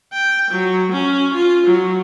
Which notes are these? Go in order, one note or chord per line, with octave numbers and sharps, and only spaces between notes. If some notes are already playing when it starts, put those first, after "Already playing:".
G5
F#3
C#4
F4
F#3